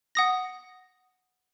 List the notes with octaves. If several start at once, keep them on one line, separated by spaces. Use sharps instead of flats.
F#5 D#6 A#6